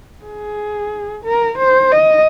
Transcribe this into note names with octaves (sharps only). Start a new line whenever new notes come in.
G#4
A#4
C5
D#5